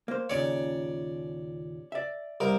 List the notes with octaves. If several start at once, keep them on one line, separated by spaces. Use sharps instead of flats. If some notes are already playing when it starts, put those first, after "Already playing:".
A#3 C5
D#2 A#2 C#3 C#5 D5
D5 E5
C2 A#4